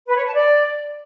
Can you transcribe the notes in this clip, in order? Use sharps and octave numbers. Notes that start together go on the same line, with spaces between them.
B4
C#5
A5
D5